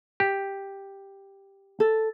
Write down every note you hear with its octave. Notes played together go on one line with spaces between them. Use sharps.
G4
A4